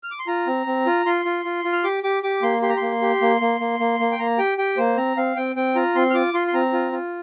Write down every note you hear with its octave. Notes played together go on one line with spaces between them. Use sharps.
F6
D6
C6
F4 A#5
C4
C4
F4
F4 C6
F4
F4
F4
F6
G4 D6
G4 D6
G4 D6
A#3 C6
G4 C6
A#5
A#3 C6
G4
A#3
A#3
A#3
A#3
A#3
G5
A#3 A#5
G4 G5
G4 G5
A#3 C5
C4 A#5
C4 F5
C4 G5
C4 G5
F4 A#5
C4 C6
F6
F4 D6
F4 C6
C6
C4 A#5
F4
F4